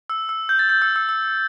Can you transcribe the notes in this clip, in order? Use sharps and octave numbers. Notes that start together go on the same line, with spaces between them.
E6
E6
G6
A6
G6
E6
E6
E6